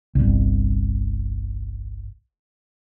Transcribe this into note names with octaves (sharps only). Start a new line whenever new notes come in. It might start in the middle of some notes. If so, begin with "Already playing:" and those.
G1 C2